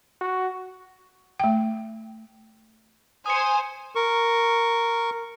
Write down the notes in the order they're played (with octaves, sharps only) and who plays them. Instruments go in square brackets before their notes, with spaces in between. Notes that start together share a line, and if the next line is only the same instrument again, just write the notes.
[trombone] F#4
[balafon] A3 G5
[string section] C5 G#5 [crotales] D#6 C#7
[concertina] A#4 C#6